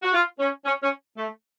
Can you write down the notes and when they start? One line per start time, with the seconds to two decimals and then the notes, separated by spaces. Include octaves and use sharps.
0.03 F#4
0.14 F4
0.40 C#4
0.65 C#4
0.83 C#4
1.17 A3